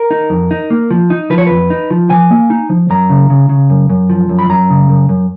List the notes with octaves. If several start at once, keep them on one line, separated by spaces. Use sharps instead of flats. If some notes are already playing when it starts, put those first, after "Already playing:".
Already playing: A#4
D#4
F2
D#4
A#3
F3
D#4
F3 B4
C#5
F2 B4
D#4
F3
F3 G#5
A#3
D#4
F3
F#2 A#5
C#3
C#3
C#3
F#2
F#2
F3
F#2
B5
F#2 A#5
C#3
F#2
F#2